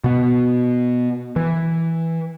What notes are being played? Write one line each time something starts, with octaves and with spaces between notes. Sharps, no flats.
B2 B3
E3